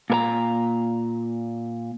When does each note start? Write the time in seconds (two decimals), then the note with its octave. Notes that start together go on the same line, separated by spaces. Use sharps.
0.10 A#2 A#4 A#5